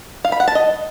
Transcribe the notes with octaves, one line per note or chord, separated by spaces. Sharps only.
F5
B5
F#5
A5
D#5